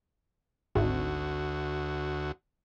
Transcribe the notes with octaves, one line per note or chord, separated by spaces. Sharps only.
G#1 D2 F#4